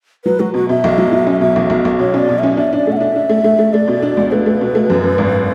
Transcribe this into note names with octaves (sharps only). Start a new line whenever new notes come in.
F#3 B4
F#3 F#4
B2 F#4
B2 E5
B1
F#3
F#3
C#4
B2 E5
B1
B1
B1
B2 C#5
C#4 D5
B2
C#4 E5
D4 E5
D4 D5
A3
F#5
D4 E5
D4
A3
A3
A3
A3 D5
B2
D4
C#2
A3 B4
A3
B2
A3
F#2
F#2
G#1